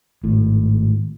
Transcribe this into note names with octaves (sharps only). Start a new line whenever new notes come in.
G#1 A2